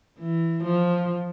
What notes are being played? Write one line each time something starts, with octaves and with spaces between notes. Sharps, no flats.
E3
F3